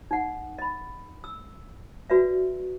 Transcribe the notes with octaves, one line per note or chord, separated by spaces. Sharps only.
D#4 F#5
D#5 B5
E6
F#4 B4 D5 E5